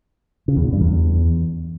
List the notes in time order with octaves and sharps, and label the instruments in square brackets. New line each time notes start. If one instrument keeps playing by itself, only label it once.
[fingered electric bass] C#3
E2
A#2
G2
E2